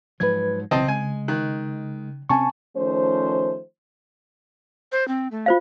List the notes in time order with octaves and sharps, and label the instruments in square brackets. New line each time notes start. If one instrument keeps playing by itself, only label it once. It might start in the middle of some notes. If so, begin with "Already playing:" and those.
[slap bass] G#2 F3 F#3 [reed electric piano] B4 G#6
[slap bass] B1 E3 [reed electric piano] C#3 [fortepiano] C4 D#5 A5
[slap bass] G#3 [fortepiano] G#5
[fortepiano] D#3 F#6
[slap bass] C3 C4 C#4 [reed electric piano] G#5 A5 C#6
[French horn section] D#3 F3 A3 C#4 C5
[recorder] C5
C4
A3
[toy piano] F4 C5 F5